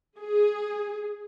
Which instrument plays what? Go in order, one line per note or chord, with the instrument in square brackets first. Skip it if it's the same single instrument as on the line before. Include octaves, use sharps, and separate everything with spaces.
[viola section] G#4